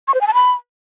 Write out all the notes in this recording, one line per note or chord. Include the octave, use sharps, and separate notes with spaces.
C#6
C5
G#5
A5
B5